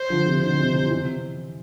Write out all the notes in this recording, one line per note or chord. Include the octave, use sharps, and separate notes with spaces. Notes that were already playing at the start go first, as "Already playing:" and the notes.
Already playing: C5
D3 F3
C3 E3
B2 D3 C5
C3
C3 E3
C3 E3